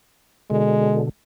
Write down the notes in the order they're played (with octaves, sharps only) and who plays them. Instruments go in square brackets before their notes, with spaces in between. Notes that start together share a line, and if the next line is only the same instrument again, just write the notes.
[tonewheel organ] B2 D3 [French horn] G#3